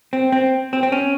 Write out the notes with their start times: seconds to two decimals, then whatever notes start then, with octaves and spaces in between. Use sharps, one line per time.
0.13 C4
0.32 C4
0.73 C4
0.83 C4
0.92 C#4